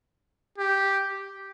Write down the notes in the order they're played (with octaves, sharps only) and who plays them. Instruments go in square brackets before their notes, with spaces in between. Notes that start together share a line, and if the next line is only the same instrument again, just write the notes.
[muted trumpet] G4